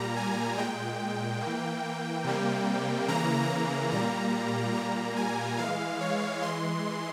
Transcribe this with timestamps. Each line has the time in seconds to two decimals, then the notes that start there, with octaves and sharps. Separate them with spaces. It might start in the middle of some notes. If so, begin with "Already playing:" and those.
Already playing: A#2 G3 A#3 A#5
0.16 G#5
0.57 A#2 G#3 G5
1.41 A#3
1.47 E3
2.24 C3 G3 A#3
3.08 C#3 E3 A#3 A#5
3.50 A#5
3.91 A#2 G3 A#3 A#5
4.75 A#2 G3 A#3 A#5
5.16 G#5
5.58 E3 G#3 F5
6.01 C#5
6.42 E3 G#3 C6